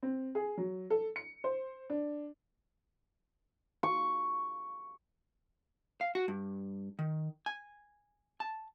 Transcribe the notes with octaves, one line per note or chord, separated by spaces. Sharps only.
C4
G#4
F#3
A4
C#7
C5
D4
C#6
F5
F#4
G2
D#3
G#5
A5